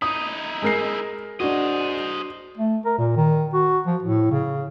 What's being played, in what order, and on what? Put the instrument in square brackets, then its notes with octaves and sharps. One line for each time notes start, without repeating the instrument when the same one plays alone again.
[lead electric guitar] D#4 E4 [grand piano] D#6
[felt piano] G#3 A#4 C7
[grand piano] D4 F#4 [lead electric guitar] C5 D#5
[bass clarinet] A3
A#4
A#2
D#3
F#4
F3
A2
C#3